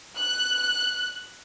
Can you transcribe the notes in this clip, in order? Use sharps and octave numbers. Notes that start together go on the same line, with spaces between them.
F#6